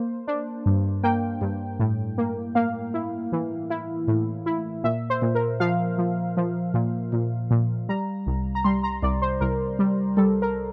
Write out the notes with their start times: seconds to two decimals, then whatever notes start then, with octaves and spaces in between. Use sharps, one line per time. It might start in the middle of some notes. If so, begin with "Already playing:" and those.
Already playing: A#3 C5
0.28 D4
0.66 G2
1.03 A#3 G5
1.41 G2
1.79 A2
2.18 A#3
2.55 A#3 F5
2.94 E4
3.32 E3
3.70 E4
4.08 A2
4.46 E4
4.84 A#2 E5
5.10 C5
5.22 A#2
5.35 A#4
5.60 F3 F5
5.98 F3
6.37 F3
6.74 A#2
7.12 A#2
7.51 A#2
7.89 G3 A#5
8.26 C2
8.55 A#5
8.64 G3 C6
8.84 A#5
9.03 C2 D5
9.22 C5
9.41 C2 A#4
9.79 G3
10.17 G3 A4
10.42 A#4